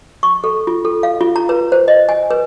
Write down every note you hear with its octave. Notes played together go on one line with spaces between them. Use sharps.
C#6
A4
F4
A4
F5
F4
A#5
B4
C5
D#5
G#5
B4